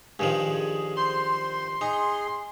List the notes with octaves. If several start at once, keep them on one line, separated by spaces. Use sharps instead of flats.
G2 D#3 F3 G#4
C5 C6
D#4 G#4